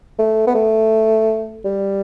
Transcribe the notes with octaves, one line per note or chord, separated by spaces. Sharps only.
A3
B3
A3
G3